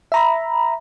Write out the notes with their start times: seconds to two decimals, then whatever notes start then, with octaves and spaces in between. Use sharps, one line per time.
0.12 E5 A#5 B5